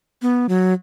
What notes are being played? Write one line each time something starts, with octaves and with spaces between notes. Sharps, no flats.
B3
F#3